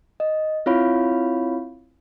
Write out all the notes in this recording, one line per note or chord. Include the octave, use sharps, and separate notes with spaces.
D#5
C4 E4 F4 C#5 F5 B5